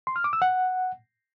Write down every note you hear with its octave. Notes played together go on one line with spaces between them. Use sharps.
C6
F6
D6
E6
F#5